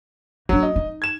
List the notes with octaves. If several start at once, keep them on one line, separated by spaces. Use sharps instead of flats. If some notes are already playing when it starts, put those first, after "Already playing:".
F#3 A#3 D4
D#5
D#4
G#6 E7